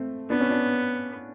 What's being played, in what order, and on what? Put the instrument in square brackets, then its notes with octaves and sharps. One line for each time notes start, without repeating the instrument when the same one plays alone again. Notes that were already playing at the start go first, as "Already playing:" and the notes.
Already playing: [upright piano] A3 C4
[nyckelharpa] B3 [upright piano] D4
[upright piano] C#4
D4